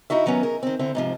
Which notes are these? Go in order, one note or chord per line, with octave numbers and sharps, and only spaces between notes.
D#4 E4 F#4 E5
D#3 F#3 B3 C#4
G#4 A#4
D#3 C4
D3 C4 E4
G#2 C3 F3